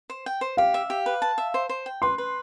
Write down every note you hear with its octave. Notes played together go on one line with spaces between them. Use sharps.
C5
G5
C5
G4 F5
E5
G4
B4
A5
E5
C5
C5
G5
B4 C6
B4